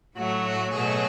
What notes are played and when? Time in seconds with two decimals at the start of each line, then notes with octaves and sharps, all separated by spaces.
0.15 A2 F#3 A3 F#4
0.45 F#4
0.74 B2 F#3 A3 G#4